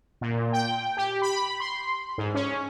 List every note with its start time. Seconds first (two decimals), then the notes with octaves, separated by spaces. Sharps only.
0.21 A#2
0.53 G5
0.97 G4
1.22 B5
1.60 C6
2.18 G#2
2.34 C#4